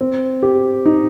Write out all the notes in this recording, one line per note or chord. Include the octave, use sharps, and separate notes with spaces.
C4
G4
D#4